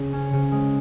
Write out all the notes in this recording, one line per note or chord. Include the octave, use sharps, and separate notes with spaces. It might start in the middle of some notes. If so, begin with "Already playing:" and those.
Already playing: C#3
C#4
C#3
G#3